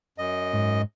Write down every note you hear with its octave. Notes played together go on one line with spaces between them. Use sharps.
F#2 D#5
G#2